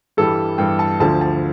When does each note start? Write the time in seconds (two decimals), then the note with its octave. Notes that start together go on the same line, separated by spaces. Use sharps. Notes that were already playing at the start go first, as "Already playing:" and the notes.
0.17 G2 E3 G3 A4
0.58 G2 E3 G3 G5
0.79 A5
1.00 D2 D3 F3 A5
1.21 A5